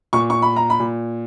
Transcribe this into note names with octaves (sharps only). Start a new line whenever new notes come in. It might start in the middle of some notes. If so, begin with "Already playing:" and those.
A#2 C#6
C#6
B5
A#5
B5
A#2